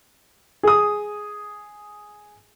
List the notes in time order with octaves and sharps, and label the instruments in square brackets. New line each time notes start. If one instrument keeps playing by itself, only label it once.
[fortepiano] G#4 D#6